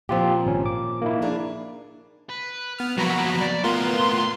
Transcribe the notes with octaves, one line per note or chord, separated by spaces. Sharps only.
A#2 F3 C4 F4 G4
G#1 C#4
D6
A#3 D#4 E4
D4 G#4 A#4
B4
B3 F6
B2 F3 F#3 A#3 F#4 A#5 B5
D5
A2 A#3 B3 F4 A#4 C6